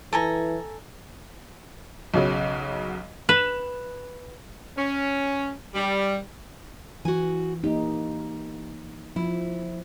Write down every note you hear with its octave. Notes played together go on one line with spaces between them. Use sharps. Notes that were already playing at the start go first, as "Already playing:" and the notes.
E3 A4 G#5 A#5
B1 C#3 F#3
B4 E7
C#4
G3
E3 F#4 G#5
A#3 D#4 G4
F3 E4